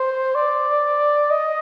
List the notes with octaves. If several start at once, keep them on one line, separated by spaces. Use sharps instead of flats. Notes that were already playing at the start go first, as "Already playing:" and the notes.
Already playing: C5
D5
D#5